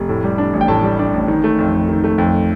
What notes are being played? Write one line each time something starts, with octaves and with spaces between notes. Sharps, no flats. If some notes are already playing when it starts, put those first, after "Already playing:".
Already playing: F1
A2
G3
D4
A1
G5
A2 A5
G3
D4
A1
D#3
A3
F2
F2
D#3
A3
F2